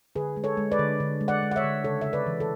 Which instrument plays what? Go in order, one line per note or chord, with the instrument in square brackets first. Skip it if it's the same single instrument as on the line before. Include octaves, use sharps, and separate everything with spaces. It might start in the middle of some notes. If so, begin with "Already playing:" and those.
[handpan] D3 G#4 B4
G#3
A4 C#5
G#3
B4 D5
D3
D3
G#3
D5 F#5
G#3
F#5
C#5 E5
D3
C#3 A4 C#5
C#3 E5
B4 D5
E3
A4